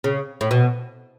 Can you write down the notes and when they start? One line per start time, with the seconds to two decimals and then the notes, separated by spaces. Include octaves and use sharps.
0.04 C#3
0.41 A2
0.51 B2